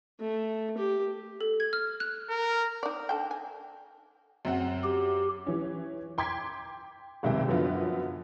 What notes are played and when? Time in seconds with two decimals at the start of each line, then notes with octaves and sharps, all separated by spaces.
0.20 A3
0.77 G4
1.41 A4
1.60 G#6
1.73 F6
2.00 F#6
2.29 A#4
2.83 D#4 D5
3.09 D3 A4 G5
3.31 G#5
4.45 F#2 C4 F#5
4.84 G4
5.47 E3 C#4
6.18 G5 C6 D6 G#6 B6
7.23 G1 C#2 C3 D#3 E5 G5
7.48 F#2 D3 F3 F#3 B3 F4